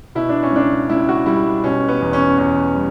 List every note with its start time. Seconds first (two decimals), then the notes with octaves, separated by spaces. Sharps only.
0.15 B2 E4
0.29 D4
0.43 C#4
0.52 C#2 D4
0.89 C#2 E4
1.09 F#4
1.26 G3 E4
1.64 B2 C#4
1.88 B3
2.01 E2
2.13 C#4
2.38 E2 C#4
2.75 G3